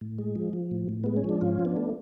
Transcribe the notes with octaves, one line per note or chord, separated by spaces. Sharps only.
A2
G#3
F3
F3
A2
A2
G#3 B3
C#4
F3 D4
G#2 C#4 F4
F3
B3 D4
A3